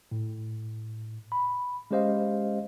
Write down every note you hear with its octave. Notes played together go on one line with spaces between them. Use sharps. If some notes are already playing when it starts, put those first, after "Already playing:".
A2
B5
G#3 C#4 G4 C5 D#5 F5